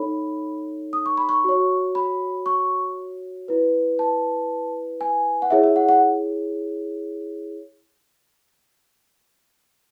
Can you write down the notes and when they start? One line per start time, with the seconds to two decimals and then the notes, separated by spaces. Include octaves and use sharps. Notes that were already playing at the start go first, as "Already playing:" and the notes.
Already playing: D#4 A4 C#5 B5
0.93 D#6
1.06 C#6
1.18 B5
1.29 C#6
1.44 F#4 C#5
1.95 B5
2.46 C#6
3.48 E4 B4
3.99 A5
5.01 G#5
5.42 F#5
5.50 E4 G#4 C#5 E5
5.63 E5
5.76 F#5
5.89 F#5